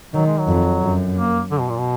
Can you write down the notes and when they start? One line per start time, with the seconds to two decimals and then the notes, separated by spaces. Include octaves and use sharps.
0.14 D#3 F#3
0.27 G#3
0.39 F#3
0.48 F2
0.82 F#2
1.17 A#3
1.51 D3
1.60 B2
1.69 A#2
1.78 B2